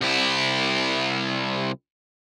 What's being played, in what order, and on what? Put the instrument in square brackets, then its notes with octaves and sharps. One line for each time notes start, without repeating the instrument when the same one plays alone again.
[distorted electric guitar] C2 E4